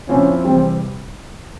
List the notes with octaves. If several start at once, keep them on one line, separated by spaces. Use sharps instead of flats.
A#2 F3 C4 C#4 E4
E2 C3 G3 C4